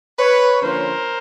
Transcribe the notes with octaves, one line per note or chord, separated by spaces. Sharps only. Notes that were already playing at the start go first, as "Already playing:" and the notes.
B4 C#5
D3 F3 A#3 C#4 F4 A#4 C5